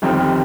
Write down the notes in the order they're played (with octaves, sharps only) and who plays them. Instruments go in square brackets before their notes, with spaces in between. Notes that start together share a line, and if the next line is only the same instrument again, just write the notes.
[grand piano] G1 F2 D#3 G3 C4